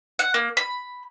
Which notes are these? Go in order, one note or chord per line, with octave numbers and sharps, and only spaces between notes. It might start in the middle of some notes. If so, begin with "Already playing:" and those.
F#5
A#3
B5